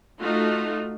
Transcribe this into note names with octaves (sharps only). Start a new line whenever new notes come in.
A3 D#4 F4 F#4